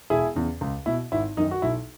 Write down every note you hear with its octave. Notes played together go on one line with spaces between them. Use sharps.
E1 E4 G#4
E2 C#3
C#2
B2 E4
G#1 E4
F#2 D#3 D#4
F#4
B1 E4